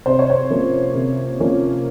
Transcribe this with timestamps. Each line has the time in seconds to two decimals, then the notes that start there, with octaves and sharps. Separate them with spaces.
0.06 C3 C5
0.19 C#5
0.30 C5
0.50 F3 A#3 C#4
0.95 C3
1.40 F3 A#3 C#4